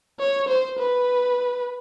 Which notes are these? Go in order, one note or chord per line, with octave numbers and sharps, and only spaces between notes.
C#5
C5
B4